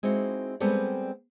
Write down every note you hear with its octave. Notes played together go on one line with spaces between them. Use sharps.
G#3 C4 D#4 E4 F#4
G3 G#3 B3 C4 A4 D5